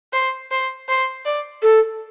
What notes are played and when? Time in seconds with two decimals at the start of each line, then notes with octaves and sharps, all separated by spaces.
0.13 C5
0.51 C5
0.89 C5
1.25 D5
1.63 A4